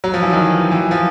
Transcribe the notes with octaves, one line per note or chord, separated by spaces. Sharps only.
F#3
F3
E3
D#3
E3
F3